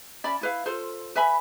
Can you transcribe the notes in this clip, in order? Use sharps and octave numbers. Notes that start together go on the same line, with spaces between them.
C#4 D5 E5 B5
E4 B4 F5
F4 A4 C5
B4 E5 G#5 B5